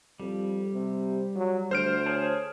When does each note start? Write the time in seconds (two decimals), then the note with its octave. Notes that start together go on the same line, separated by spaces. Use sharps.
0.20 F2 G3
0.74 C3
1.36 F#3
1.71 D2 C5 F6 D7
2.06 G#4 C#5 A5